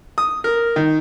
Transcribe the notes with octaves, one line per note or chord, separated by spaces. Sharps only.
D#6
A#4
D#3